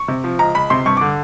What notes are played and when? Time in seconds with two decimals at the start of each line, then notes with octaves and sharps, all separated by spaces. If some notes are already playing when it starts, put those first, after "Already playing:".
Already playing: C#6
0.08 C3
0.24 F3
0.39 C#2 A#5
0.55 C#2 B5
0.70 C3 C6
0.86 G2 C#6
0.97 D3 D6